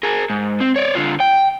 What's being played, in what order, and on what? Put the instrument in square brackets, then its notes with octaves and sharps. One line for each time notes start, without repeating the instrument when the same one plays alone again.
[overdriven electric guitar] G#4 A#4
G#2
C4
C#5 D5
D3 F4
G5